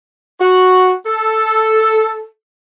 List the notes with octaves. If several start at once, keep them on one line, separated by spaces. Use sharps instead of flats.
F#4
A4